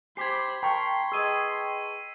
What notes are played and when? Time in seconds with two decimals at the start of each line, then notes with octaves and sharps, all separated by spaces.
0.17 G4 C5 B5 G#6 B6 C7
0.63 A#4 G5 A5 C6 C#6
1.12 G#4 B4 D#5 E6 D#7